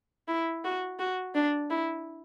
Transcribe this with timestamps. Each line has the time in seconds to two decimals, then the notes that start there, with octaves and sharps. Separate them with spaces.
0.28 E4
0.64 F#4
0.99 F#4
1.35 D4
1.70 E4